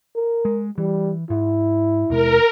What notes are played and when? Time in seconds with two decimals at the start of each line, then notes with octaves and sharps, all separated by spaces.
0.15 A#4
0.45 G#3
0.78 E3 G3
1.30 G#2 E4
2.10 D#2 B2 G#3 A#4